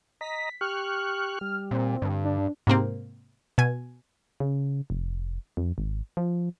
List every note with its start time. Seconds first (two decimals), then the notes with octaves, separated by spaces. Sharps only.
0.21 D#5 A#5 B6
0.61 G4 C#6 F6 F#6
1.41 G3
1.71 A#2 C4
2.02 G2 D3
2.25 D4
2.67 G#2 C3 A#3 C4
3.58 B2 G#5
4.40 C#3
4.90 F1
5.57 F2
5.78 G#1
6.17 F3